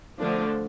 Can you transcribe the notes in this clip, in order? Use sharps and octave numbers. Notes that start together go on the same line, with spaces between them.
D3 F3 A3 D4